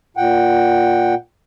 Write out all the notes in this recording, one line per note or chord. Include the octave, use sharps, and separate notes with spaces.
A#2 F#5 G5